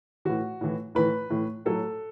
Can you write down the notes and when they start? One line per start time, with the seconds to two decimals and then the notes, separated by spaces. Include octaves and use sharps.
0.25 A2 E3 F#4
0.61 A2 E3
0.95 A2 E3 B4
1.30 A2 E3
1.65 A2 F#3 A4